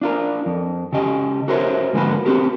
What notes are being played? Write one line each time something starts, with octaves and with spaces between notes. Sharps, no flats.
D4 F4 A#4
F2
C#3 G4 D#5
F#4 A#4 C5 C#5 E5
G#2 D3 F3 A#3 F#4 B4
C4 F#4 G4 A#4